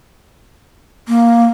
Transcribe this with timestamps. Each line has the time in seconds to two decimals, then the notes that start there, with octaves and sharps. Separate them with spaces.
1.08 A#3